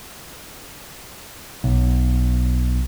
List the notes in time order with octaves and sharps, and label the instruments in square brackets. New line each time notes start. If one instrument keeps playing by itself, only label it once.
[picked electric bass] B1